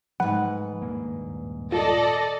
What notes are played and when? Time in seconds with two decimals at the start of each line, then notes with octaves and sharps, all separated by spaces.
0.20 G#2 F3 F#3 A3 B4 F#5
0.82 D#1 G2 A#3
1.72 F4 A4 D5 D#5